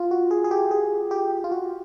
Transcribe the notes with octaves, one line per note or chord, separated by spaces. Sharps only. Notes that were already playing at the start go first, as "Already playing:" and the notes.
Already playing: F4
F#4
G#4
G#4
G4
G#4
G4
F4
F#4